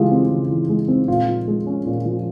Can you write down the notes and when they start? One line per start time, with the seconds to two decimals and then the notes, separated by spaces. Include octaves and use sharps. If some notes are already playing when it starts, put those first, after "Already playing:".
Already playing: C#3 E3 G#3 F4 G4
0.11 C4
0.30 C#3
0.49 E3
0.69 G#3
0.88 C4
1.08 A#2 F4
1.28 F3
1.47 G#3
1.66 C#4
1.86 A#2
2.05 F3